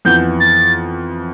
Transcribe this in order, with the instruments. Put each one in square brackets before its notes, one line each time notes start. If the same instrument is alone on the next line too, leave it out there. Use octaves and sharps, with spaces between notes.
[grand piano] F2 E3 B3 [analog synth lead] G6
[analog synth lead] A6